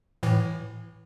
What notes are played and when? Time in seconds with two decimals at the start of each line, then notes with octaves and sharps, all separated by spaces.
0.23 A2 E3